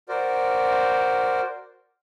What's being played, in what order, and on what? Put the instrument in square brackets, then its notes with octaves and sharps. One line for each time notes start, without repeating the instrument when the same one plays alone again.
[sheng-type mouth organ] F#4 A#4 C5 D5